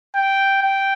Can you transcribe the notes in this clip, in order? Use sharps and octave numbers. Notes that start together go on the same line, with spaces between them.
G5
G5